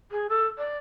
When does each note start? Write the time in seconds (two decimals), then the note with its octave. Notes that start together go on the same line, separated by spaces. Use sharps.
0.12 G#4
0.29 A4
0.58 D5